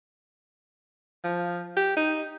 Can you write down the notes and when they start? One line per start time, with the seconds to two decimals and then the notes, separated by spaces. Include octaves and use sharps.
1.24 F3
1.77 G4
1.96 D#4